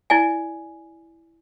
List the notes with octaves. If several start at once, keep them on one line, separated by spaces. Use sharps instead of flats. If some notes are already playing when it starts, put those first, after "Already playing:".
E4 D5 G#5